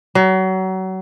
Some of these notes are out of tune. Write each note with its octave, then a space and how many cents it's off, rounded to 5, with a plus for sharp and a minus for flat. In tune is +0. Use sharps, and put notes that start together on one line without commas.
F#3 +30